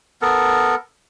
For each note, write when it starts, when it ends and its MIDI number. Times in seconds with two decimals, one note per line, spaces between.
0.22 0.75 59
0.22 0.75 69
0.22 0.75 70